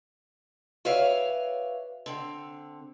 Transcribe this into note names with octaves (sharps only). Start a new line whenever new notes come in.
F#4 B4 C#5 D5 E5 F5
D3 C4